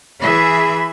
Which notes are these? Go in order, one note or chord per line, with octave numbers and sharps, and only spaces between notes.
E3 G#4 E5 B5